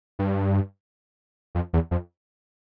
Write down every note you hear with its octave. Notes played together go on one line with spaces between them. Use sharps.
G2
F2
E2
F2